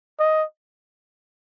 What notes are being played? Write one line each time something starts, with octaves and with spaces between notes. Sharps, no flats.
D#5